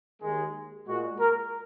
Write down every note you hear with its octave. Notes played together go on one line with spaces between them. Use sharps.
D#2 D#3 G#3
A#2 G#3 F#4
A#4